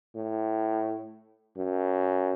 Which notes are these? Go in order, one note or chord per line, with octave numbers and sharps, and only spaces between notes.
A2
F#2